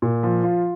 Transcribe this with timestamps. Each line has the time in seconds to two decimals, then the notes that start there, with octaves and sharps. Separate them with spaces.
0.02 A#2
0.23 F3
0.44 F4